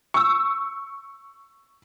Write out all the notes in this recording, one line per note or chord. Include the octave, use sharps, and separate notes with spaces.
C#6 E6